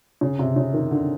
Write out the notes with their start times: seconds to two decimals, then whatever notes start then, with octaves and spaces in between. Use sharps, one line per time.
0.21 C#3
0.39 C3
0.56 C#3
0.74 D#3
0.91 D3